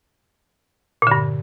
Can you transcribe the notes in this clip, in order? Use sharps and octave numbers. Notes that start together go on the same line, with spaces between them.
G2 A#2 D3